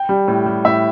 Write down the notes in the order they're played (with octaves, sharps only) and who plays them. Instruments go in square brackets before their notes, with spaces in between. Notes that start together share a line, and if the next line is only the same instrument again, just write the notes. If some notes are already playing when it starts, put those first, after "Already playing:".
Already playing: [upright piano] G5
G3
A2
G3
A2 E5